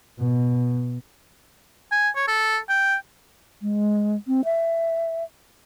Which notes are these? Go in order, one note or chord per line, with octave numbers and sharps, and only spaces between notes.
B2
G#5
C#5
A4
G5
G#3
C4
E5